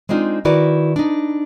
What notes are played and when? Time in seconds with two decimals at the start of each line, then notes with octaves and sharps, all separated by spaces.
0.09 G#3 C4 D4 D#4 F4
0.45 D#3 E4 F#4 B4 D5
0.96 D4 D#4